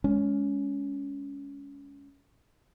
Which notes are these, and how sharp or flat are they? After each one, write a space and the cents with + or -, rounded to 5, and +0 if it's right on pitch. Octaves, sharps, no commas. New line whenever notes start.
G#3 +0 C#4 +20